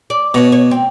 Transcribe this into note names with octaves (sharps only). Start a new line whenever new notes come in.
D5
B2 C#4 F#4
C#5
C4